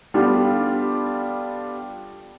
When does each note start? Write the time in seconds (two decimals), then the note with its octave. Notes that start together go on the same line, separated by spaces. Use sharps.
0.14 G3 B3 D4 F4 G4 A4